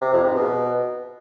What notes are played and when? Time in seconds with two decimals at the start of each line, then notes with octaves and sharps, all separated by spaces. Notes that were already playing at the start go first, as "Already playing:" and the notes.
0.01 C3
0.13 F2
0.24 G#2
0.35 B2